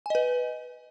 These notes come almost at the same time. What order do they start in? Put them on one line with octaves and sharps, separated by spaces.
G#5 D#5 B4